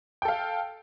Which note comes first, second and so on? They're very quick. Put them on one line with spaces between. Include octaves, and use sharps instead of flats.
G5 A4 F5